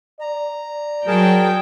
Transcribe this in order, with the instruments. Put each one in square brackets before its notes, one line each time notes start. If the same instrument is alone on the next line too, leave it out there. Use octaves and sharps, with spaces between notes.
[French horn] D5 [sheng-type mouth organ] A#5
[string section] F#3 G5 [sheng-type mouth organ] G#4 A#4 A5